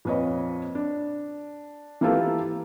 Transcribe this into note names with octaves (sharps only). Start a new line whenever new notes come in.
F2 A#2 B4 C#5 D#5
D4
E3 A#3 F4 G4 A4 B4